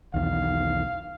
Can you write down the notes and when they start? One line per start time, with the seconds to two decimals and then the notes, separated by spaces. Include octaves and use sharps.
0.14 B1 E2 D#3 F5